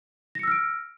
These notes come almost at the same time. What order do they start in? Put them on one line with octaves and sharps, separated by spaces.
A#6 C#7 E6 F6 D7